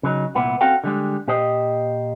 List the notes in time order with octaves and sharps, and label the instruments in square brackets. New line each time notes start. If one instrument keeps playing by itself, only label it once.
[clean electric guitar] C#3 F#3 D#4
C2 A#2 B3 E4
C4 C#4 F#4 A4 F5 G5
D3 G3 G#3
A#2 G4 C5 D#5